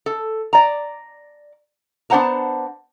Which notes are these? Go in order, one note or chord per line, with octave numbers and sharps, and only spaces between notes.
A4
D5 A#5
B3 D4 C5 F#5 A5 A#5